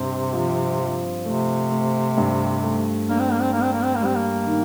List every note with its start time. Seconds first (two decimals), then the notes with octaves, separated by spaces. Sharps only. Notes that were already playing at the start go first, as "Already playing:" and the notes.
Already playing: G2 C3 C4
0.33 F3
0.78 F3
1.25 C3 A3
1.70 A3
2.17 G2
2.63 A3
3.10 A#3 D4
3.19 C4
3.31 A#3
3.41 C4
3.52 A#3 D4
3.62 C4
3.73 A#3
3.83 C4
3.95 A#3
4.02 G3 C4
4.16 A#3
4.47 D#3